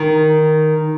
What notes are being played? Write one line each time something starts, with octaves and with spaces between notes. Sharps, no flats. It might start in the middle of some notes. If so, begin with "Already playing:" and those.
Already playing: D#3